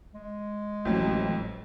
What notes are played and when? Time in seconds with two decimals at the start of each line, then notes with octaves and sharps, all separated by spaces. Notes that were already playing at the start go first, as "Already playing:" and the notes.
0.14 G#3
0.85 A1 F2 F#3